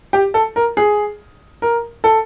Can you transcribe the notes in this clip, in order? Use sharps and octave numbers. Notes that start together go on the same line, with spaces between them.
G4
A4
A#4
G#4
A#4
A4